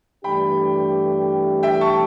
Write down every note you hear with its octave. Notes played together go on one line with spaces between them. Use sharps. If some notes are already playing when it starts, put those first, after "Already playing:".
G2 E3 A3 D4 G4 G5 B5
E5 G5
A5 C#6